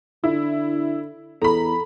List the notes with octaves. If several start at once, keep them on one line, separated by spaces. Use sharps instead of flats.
D3 E4
E2 A4 A#5 B5